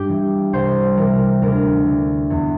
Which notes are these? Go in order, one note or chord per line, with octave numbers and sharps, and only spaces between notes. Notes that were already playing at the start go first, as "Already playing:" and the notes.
Already playing: G2 G4
E3
C2 C5
C3 E3 A#4
D2 A#4
D3
E2